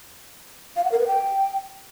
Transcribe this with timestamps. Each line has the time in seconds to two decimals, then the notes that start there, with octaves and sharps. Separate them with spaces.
0.76 F5
0.84 F#5
0.92 A#4
0.99 B4
1.07 G5